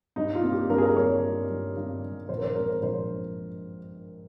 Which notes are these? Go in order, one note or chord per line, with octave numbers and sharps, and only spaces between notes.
G2 D#4
F4
A#3
G4
G2 A#4
G#4
A#4
G2 C#5
G3
G2
G2
G2
A#1 C5
A#4
C5
G#2 A#4
C5
A#1 C5